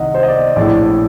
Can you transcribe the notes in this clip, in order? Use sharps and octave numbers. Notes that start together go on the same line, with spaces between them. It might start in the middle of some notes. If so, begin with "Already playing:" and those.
Already playing: C2 D#3 D#5 F#5
C5
D#5
D5
A#1 A2 D5